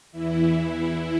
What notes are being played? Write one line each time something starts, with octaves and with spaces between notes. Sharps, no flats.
E2 E3 E4